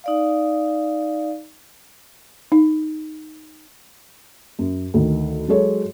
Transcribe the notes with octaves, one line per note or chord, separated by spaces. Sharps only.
D#4 D5 F5
D#4
F#2
D2 D#3
F#3 G#3 A4 C#5